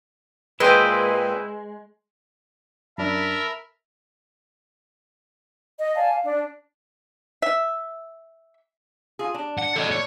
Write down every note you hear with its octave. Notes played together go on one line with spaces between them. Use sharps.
A#2 G#3 C4 E4 B4 D#5 G5 C6
F#2 D4 A#4 E5 A5 B5
D#5
D5 F5 G#5 A5
F5
D4
E5
F4 G#4
D4
F#5
A2 A4 D5 D#5
C#5